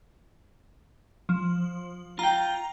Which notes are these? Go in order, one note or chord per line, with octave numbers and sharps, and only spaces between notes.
F3
F4 G5 A#5